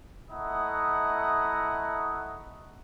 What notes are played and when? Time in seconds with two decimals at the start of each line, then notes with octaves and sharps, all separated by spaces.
0.30 A3 E4 D#5 F#5 A#5 D#6